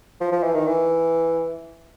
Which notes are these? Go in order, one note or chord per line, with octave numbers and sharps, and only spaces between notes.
F3
F3
E3
D#3
E3